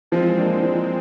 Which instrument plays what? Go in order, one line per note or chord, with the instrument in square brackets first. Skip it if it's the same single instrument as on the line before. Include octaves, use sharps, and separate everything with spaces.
[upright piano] F3 [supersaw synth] G#3 C4
[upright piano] A#3 D4
F3